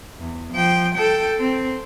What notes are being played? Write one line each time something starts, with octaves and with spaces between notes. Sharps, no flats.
E2
F3 G5
A4 G5
C4